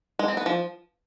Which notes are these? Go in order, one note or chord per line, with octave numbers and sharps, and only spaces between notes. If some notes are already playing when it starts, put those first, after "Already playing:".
G#3
C4
B3
F3